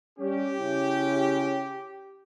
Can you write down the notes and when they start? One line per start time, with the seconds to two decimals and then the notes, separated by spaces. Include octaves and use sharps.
0.19 G3 C#4 G4
0.59 C#3 C#4 E4